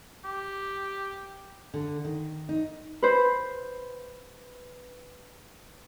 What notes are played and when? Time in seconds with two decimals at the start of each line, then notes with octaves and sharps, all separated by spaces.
0.25 G4
1.74 D3
2.05 D#3
2.49 D#4
3.02 B4 C5